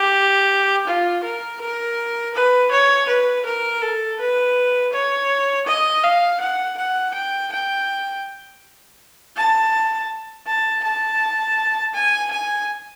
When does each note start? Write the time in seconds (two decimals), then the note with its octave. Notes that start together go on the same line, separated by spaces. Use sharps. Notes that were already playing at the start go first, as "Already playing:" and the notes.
Already playing: G4
0.87 F4
1.24 A#4
1.61 A#4
2.34 B4
2.72 C#5
3.08 B4
3.46 A#4
3.82 A4
4.19 B4
4.93 C#5
5.67 D#5
6.04 F5
6.40 F#5
6.77 F#5
7.14 G5
7.52 G5
9.36 A5
10.46 A5
10.84 A5
11.94 G#5
12.31 G#5